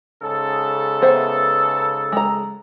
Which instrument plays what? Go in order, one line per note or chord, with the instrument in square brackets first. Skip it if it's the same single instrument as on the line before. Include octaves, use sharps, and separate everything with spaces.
[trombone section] G#2 C#3 A4
[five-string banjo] B3 C5 E5
G#3 A#5